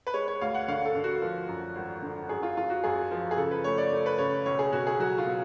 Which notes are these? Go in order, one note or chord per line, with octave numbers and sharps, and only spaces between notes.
B4
G#3 C#5
C#5
D2 F5
F#5
D3 F5
A4
D3
F#4
F3
F#2
G#1
D3
F#2 G#4
F4
F#2 F4
F#4
F#2 G#4
F3
G#4
C#3 A4
B4
A3 C#5
D5
A3
B4
C#3 C#5
B1 C#5
G#4
B2 F#4
G#4
F#3 F#4
F4
B2